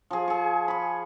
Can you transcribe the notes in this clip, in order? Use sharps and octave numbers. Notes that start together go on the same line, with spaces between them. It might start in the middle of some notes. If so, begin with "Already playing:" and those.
F3 G#4
G#4 C#6
B5 C#6